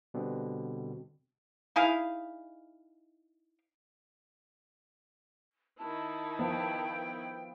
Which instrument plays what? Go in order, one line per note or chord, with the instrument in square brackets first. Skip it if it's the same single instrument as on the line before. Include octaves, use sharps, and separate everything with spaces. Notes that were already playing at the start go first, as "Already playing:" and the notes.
[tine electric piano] B2 D3 G3 C4
[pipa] D#4 E4 G#4 F5
[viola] D#3 E4 [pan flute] A5
[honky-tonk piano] F3 B3 [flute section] G5